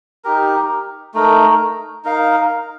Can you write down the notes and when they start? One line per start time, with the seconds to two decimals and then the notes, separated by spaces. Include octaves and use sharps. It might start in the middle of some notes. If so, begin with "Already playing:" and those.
0.25 D#4 G4 A#4
1.14 A3 D#4 A#4
2.05 D#4 A#4 F5